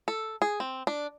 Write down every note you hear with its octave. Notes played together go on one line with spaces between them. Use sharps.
A4
G#4
C4
D4